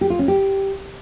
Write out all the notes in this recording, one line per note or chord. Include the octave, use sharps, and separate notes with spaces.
G4
F4
C#4
G4